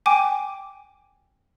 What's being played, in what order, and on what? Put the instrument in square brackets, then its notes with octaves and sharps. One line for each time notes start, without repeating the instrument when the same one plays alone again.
[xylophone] G5 G#5 D6